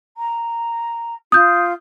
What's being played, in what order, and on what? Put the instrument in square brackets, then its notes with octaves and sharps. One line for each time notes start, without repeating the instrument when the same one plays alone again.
[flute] A#5
[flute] F4 [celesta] D#6 G6